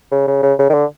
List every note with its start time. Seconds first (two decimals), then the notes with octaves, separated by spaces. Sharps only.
0.12 C#3
0.28 C#3
0.43 C#3
0.59 C#3
0.70 D#3
0.74 D3